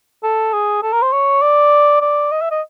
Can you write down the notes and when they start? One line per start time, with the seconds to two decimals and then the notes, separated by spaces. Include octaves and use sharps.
0.23 A4
0.53 G#4
0.83 A4
0.93 A#4
1.02 C5
1.13 C#5
1.42 D5
2.01 D5
2.32 D#5
2.42 E5
2.51 D#5